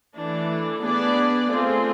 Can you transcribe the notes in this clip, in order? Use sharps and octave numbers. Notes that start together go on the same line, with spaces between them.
E3 A3 D4
B3 D4 G#4 B4 D5
A3 C4 F4 G#4